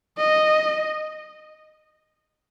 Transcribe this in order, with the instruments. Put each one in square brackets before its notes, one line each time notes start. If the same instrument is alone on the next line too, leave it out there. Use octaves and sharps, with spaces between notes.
[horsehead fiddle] D#5